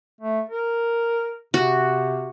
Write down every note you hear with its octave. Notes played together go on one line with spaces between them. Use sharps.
A3
A#4
C3 F#4